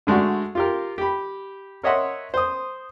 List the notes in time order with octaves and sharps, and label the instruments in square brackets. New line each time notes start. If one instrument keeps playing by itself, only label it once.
[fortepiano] D3 G#3 A3 D4 F#4
F4 G4 A#4
G4 B5
A#4 C#5 D#5 E5 F#5 C6
C5 D#6